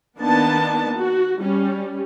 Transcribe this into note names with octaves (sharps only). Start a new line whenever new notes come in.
D#3 A#3 B3 D4 A5
F#4
G3 C#4